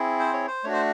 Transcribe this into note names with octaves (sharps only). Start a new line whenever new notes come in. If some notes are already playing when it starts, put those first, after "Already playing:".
Already playing: C4 E4 G#4
C5
C#5
C5
A3 D4 F#4 C#5
C5